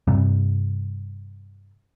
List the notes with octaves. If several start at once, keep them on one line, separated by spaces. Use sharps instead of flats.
G2 C3 G3